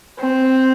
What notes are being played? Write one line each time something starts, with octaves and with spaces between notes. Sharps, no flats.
C4